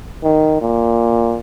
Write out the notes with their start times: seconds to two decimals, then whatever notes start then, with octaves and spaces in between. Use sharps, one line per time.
0.24 D#3
0.61 A#2